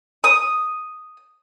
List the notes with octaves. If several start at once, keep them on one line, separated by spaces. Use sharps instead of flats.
D#6